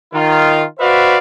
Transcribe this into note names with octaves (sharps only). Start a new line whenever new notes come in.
D#3 F4
F#4 B4 C5 D5 E5 F5